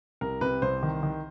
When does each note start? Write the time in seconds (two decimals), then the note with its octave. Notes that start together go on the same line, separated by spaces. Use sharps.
0.21 C2 A#4
0.41 C3 B4
0.62 C2 C5
0.83 D#3
1.03 D#3